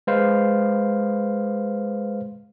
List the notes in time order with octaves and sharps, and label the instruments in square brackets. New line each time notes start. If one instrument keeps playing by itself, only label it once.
[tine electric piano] G#3 B4 C5 F5